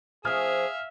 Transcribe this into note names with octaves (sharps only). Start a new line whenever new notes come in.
F3 C#4 G#4 E5 F5 G#5 D#6 F6